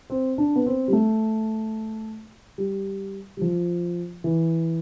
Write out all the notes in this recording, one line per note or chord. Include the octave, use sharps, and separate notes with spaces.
C4
D4
B3
C4
G3
A3
G3
G3
F3
E3